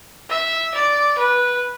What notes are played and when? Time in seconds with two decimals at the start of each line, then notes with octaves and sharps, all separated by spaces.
0.29 E5
0.74 D5
1.18 B4